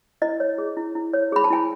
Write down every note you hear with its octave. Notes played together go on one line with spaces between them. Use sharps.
E4 D#5
C#5
G#4
E4
E4
C#5
G#4 B5
A5
E4 G#5